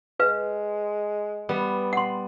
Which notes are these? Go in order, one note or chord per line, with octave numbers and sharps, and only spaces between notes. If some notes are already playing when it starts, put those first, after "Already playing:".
G#3 B4 F5
G3 B3
F#5 C6